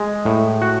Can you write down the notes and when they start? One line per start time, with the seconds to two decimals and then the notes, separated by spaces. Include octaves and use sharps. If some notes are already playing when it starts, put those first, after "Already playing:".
Already playing: G#3
0.25 A2
0.62 F#4